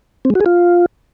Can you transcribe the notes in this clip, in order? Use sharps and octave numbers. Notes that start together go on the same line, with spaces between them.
C4
G#3
F#4
G#4
F4